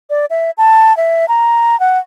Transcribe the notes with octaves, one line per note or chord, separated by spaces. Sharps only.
D5
E5
A5
E5
A#5
F#5